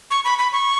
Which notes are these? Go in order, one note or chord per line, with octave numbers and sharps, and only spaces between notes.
C#6
B5
B5
C#6